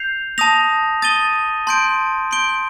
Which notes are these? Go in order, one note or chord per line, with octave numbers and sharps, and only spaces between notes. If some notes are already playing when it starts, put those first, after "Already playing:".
Already playing: G6 C7 F7
A5 D#6 A#6 F7
D#6 A6 D#7 G7
A5 C6 G6 D7
C6 G6 D7 G7